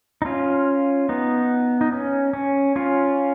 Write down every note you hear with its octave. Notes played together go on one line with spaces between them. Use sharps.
D#4
C#4 F4
B3 D#4
D#4
C#4
C#4
C#4 F4